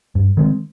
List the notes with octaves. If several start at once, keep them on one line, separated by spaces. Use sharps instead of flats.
G2
D#3 G#3 C4